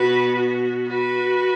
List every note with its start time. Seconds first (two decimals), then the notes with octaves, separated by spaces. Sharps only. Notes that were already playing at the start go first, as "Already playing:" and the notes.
Already playing: B2 B3 F#4 B4
0.34 F#4
0.88 F#4 B4